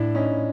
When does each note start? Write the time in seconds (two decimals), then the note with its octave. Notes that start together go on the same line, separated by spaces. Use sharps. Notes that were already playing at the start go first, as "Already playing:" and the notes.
Already playing: A2 D4 E4
0.15 C#4 D#4